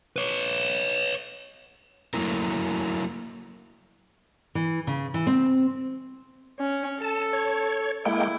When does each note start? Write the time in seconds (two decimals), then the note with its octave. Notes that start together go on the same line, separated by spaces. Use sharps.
0.16 B4 C#5
2.14 F#3 A3 A#3 E4 A#4
4.55 E3
4.87 C#3
5.14 E3
5.27 C4
6.59 C#4
7.02 A4 A5
7.33 C#5
8.05 G#3 A#3 E4 G5